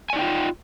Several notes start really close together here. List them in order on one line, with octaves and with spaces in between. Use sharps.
G#5 D5 D#4 G5 F4